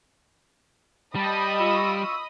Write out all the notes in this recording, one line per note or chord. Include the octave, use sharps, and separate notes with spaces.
G3 D#5 G5 A5 B5 D#6
F4 C#6 E6